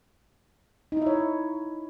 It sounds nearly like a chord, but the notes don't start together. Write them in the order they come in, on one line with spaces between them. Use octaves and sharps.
D#4 E4 E5 C#5